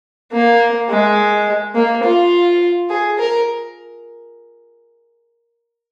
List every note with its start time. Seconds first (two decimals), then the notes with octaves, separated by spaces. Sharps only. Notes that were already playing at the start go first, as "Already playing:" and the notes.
0.32 A#3
0.90 G#3
1.75 A#3
2.04 F4
2.90 G#4
3.18 A#4